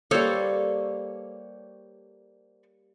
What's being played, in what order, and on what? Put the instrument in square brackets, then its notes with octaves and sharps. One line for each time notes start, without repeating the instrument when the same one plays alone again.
[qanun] G3 A#3 [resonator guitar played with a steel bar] A4 C5 C#5